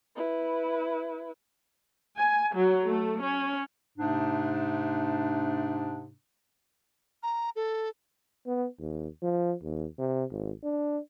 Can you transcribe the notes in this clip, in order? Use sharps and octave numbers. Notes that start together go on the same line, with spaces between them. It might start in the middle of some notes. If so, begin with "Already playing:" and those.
E4 B4
G#5
F#3
A3
C#4
G#2 C3 A3 D4
A#5
A4
B3
D#2
F3
D#2
C3
G#1
D4